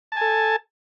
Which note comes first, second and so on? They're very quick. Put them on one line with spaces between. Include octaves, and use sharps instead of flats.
A5 G#5 A4